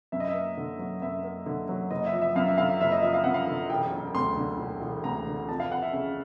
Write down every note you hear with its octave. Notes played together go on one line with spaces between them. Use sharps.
F#2 E5
D#5
E5
A#3
D3
F#3
F#2 E5
A#3
D3
F#3
F#1 D#5
E5
F3
E5
F#2 F5
E5
D3 F5
E5
F#1 E5
D#5
F3 E5
F5
F#2 F#5
F5
D3
E1 G5
E1
D2 C6
D3
E1
E1
D2 A#5
D3
F2 A5
F5
F2 F#5
E5
C#3